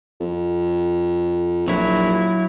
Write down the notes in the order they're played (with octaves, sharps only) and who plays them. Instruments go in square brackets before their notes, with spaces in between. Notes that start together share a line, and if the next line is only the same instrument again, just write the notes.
[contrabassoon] F2
[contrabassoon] A#1 [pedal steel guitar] F#3 E4